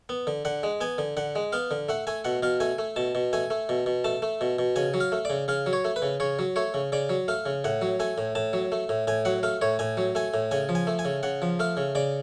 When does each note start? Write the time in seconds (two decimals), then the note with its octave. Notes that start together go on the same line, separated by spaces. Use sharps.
0.09 B3
0.27 D3
0.45 D3 F#5
0.63 G#3
0.81 B3 G#5
0.98 D3
1.17 D3 F#5
1.35 G#3
1.52 B3 F5
1.71 D3
1.89 A3 F#5
2.07 A3 G#5
2.25 B2 F#5
2.43 B2 F5
2.60 A3 G#5
2.78 A3
2.96 B2 A5
3.15 B2
3.33 A3 G#5
3.50 A3
3.69 B2
3.86 B2
4.04 A3 A5
4.22 A3
4.41 B2
4.59 B2
4.76 C#3 G#5
4.94 F#3
5.00 F5
5.12 A3
5.25 C#3 D5
5.48 C#3 F5
5.66 F#3
5.73 C#5
5.85 A3
5.96 B4
6.02 C#3
6.20 C#3 C#5
6.39 F#3
6.56 A3 C#5
6.74 C#3
6.92 C#3 D5
7.09 F#3
7.28 A3 F5
7.46 C#3
7.64 A2 F#5
7.82 F#3
8.00 A3 G#5
8.18 A2
8.35 A2 A5
8.53 F#3
8.72 A3
8.89 A2
9.07 A2 G#5
9.25 F#3 F#5
9.43 A3 F5
9.61 A2 C#5
9.79 A2 G#5
9.97 F#3
10.15 A3 G#5
10.34 A2
10.51 C#3 G#5
10.69 F3
10.75 G#5
10.87 A3
10.99 G#5
11.05 C#3
11.23 C#3 F#5
11.42 F3
11.59 A3 F5
11.77 C#3
11.95 C#3 D5